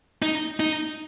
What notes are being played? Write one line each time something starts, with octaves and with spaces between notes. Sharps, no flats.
D#4
D#4